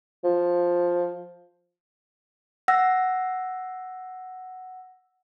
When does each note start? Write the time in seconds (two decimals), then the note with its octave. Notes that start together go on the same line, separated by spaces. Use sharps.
0.24 F3
2.68 F#5 E6 A#6